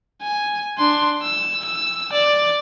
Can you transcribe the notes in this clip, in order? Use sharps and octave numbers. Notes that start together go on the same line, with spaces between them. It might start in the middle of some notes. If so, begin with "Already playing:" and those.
G#5
D4 C6
E6
E6
D5